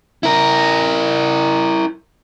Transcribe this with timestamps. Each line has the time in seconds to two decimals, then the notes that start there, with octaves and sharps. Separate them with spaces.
0.23 E4 A#4